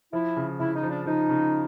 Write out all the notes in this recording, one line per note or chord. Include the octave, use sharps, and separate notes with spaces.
F3 E4
C#3
C#3 E4
D#4
F3
D4
F3 D#4
C#3